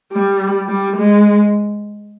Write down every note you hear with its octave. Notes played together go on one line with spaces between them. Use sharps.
G3
G3
G#3